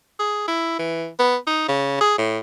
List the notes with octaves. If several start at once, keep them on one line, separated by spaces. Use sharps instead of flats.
G#4
E4
E3
B3
D#4
C#3
G#4
A2